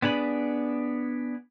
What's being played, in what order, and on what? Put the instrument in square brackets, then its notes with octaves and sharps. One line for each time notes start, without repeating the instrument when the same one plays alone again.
[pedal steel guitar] B3 D4 G#4 B5